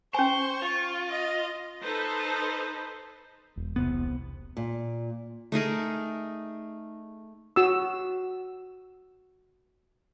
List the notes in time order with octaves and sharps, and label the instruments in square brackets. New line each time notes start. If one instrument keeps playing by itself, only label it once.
[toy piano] C#4 G#5 [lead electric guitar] C5 [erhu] C#6
[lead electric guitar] F4
[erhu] D#5
[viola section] D#4 A4 B4 C5
[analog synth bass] E1
[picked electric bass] C2 C3 B3
[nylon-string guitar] A#2
[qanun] A3 D#4 G#4 A#4
[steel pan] F#4 D#6 E6